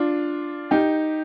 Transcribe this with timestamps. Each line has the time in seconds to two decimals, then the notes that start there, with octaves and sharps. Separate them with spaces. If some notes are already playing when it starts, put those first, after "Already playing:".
Already playing: D4 F4
0.71 D#4 G4